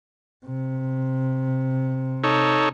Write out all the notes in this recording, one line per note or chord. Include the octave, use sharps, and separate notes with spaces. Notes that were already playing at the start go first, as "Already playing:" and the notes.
C3
D#4 A4 C#5